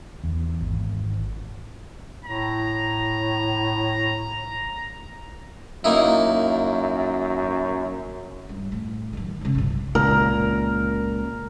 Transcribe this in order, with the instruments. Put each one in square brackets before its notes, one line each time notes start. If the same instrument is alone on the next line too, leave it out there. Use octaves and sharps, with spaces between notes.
[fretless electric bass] E2
G#1
[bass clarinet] A2 [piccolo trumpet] A#5
[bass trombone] F#2 [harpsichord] A#3 D#4 E4
[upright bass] G2
A2
D#3 F#3
G#2 C#3
G1 C2
[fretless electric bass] C#2 A#2 [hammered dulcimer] A#4